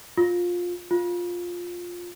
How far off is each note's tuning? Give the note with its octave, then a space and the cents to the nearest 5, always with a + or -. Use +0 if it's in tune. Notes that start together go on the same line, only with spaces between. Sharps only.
F4 +15
F4 +10